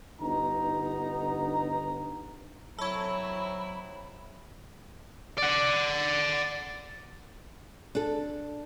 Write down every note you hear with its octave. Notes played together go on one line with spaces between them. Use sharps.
G1 D3 B3 D#4 A#5
F#3 C4 E4 A4 C#5 B5
D5 F#5
D4 A4